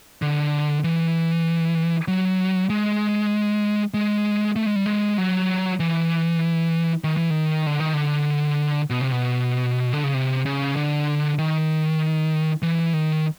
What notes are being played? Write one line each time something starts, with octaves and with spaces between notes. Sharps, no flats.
D3
E3
F#3
G#3
G#3
A3
G#3
G3
G#3
F#3
E3
D#3
E3
D#3
D3
D#3
D3
B2
C3
B2
D3
C#3
C3
C#3
D3
D#3
E3
D#3